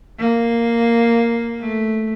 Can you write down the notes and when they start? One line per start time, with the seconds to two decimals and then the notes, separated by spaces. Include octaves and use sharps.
0.19 A#3
1.61 A3